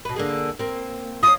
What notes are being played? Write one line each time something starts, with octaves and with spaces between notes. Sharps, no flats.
B2 B4
D3 A#3 G#4
A#3 C4
C#4 F4 D#6